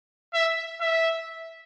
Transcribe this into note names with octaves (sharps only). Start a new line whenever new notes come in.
E5
E5